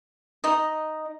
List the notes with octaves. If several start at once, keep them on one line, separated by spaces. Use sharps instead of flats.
D#4 D#5